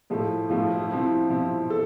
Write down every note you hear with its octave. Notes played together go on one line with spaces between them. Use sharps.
A2 F3 A3
A2 F3 A3 F4
E4
C3 F3 C4 E4
C3 F3 C4 E4
A4